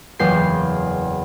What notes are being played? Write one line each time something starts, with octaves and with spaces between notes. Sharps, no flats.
F#1 E2 G6 C7